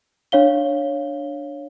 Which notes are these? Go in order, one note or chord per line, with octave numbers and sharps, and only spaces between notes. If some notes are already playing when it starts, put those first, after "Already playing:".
D4 C#5 F5 G7